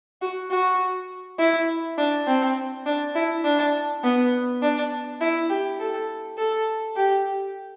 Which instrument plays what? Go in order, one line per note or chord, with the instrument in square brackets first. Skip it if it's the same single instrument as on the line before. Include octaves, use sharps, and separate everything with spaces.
[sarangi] F#4
F#4
E4
D4
C4
D4
E4
D4
B3
D4
E4
G4
A4
A4
G4